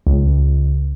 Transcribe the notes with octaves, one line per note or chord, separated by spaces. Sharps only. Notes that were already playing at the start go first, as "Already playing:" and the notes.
C#2